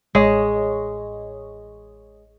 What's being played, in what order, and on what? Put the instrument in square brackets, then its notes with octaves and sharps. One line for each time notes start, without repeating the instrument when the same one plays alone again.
[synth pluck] A1 C#5 D#5 [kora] G#3